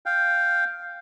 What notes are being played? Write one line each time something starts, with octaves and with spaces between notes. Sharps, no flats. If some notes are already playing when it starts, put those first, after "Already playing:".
F5 G5